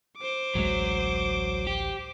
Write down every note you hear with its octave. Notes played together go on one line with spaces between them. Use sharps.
C5 D6
A1 D2 F#3 G#3
G4